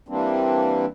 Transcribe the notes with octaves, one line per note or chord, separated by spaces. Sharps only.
E3 G3 A#3 C4 D4